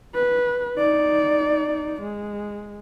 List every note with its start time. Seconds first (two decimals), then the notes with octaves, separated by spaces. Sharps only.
0.14 B4
0.78 D#4 D5
2.01 G#3